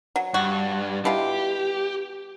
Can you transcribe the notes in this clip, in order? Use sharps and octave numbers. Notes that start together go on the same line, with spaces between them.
F#3
G2 F#4
B2 E4 F4 G4